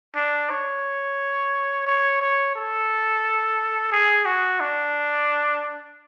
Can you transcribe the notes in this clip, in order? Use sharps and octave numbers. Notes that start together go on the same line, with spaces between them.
D4
C#5
C#5
C#5
A4
G#4
F#4
D4